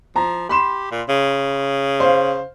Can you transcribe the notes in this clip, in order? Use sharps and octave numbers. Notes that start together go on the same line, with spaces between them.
F3 A#5
G4 B5 C6 E7
A#2
C#3
C5 F5